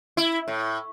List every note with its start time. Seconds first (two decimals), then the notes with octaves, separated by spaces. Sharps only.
0.17 E4
0.48 A2